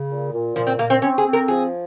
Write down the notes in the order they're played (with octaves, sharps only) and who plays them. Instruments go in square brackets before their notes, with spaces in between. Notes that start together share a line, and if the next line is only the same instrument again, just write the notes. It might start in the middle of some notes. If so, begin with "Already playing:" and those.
Already playing: [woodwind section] C#3
A#2
A#2
[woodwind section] A#2 [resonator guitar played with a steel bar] F3
[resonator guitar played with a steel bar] C4
[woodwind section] A#2 [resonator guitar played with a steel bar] A#3
[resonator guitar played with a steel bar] C4
[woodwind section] C4 [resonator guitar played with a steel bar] C#4
[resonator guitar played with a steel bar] G#4
[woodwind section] C4
[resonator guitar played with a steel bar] A#4
[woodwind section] F3 [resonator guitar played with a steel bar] G#4